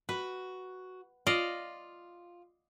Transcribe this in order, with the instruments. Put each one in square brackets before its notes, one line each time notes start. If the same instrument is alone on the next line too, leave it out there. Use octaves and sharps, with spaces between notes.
[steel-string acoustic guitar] F#4 [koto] B4
[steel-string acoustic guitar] F4 [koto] D5 D#5 F5